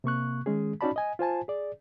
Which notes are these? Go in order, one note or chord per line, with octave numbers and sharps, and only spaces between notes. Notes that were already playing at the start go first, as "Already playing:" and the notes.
C3 A#3 C#6 F#6
D#3 G#3 C#4 G#4
C#4 D#4 F#4 D5 A5 B5
D#5 G#5
F4 C5 G#5 A5
G#4 D5